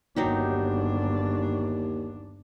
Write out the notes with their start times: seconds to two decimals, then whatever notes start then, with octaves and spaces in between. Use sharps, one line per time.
0.16 G1 D#2 F#3 D4 D#4 G4